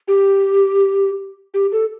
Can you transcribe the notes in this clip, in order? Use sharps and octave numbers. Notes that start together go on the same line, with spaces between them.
G4
G4
A4